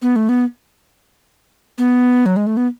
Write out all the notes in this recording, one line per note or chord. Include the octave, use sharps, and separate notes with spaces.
B3
A3
B3
B3
F#3
G#3
A3
B3